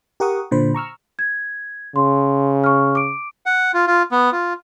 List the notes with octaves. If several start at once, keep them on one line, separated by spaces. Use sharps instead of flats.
G4 A#4 F#5 C#6 D#6
A#2 D3 C5 B5
A#5 C#6 E6 F6
G#6
C#3 C6
C#6 F6
D6 D7
F#5
F4
F4
B3
F4